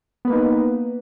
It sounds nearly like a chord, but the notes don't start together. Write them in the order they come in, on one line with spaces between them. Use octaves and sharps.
B3 B4 A#3 D#4